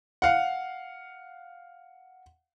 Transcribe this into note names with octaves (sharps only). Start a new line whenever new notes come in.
F5 F#5